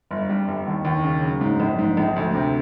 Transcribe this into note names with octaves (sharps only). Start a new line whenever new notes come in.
G1
G3
G1
D#2
D#2
C#3
F#3
G#2
A#1
G#2
A#1
D2
C3